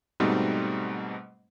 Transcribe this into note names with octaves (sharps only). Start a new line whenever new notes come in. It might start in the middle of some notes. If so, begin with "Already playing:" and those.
G#2 B2 G3 A3 C4 D#4